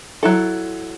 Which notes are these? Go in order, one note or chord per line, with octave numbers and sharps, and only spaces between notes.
F#3 E4 A4